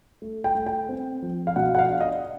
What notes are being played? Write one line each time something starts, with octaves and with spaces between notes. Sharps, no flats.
A3
G5
A3
G5
C4
F3
F5
B2 F#5
F#5
F5
D4
D#5